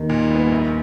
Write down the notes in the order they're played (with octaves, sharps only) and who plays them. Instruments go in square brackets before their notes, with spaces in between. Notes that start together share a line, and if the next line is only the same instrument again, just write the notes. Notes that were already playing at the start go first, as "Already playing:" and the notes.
Already playing: [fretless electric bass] D#2 D#3
[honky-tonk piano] A#2
G3 B3
A#1